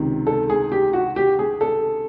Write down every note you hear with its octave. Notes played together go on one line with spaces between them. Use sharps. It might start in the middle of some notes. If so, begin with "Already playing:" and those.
Already playing: C#2 C3 D#3
A4
G#4
G4
F#4
G4
G#4
A4